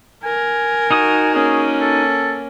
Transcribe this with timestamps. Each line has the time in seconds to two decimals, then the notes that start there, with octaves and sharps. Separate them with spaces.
0.24 A#4 G#5
0.90 D#4 F#4 D#6
1.34 A#3 C#4 G#4
1.81 A4